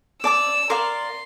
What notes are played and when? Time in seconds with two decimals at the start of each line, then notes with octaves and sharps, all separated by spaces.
0.23 D5 A5 D6 E6
0.70 A#4 D5 F5 C6